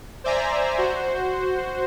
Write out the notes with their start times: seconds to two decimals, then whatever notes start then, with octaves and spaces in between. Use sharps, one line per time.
0.24 C5 D5 E5 G#5 A#5
0.78 F#4 C5